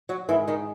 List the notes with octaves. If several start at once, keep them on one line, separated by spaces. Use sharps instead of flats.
F#3 F#4
G#2 D#3 E3 E4
D#3 D#4